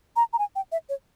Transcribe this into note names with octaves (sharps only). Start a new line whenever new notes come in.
A#5
A#5
G#5
G5
E5
C#5